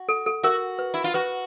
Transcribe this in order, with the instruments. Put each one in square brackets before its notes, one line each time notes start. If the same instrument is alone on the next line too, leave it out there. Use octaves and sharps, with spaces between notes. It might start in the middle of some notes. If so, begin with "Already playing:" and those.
Already playing: [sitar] F#4
[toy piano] A4
A4
[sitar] F#4 [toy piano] A#4
[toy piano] B4
[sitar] E4
F4
[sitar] F#4 [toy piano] B4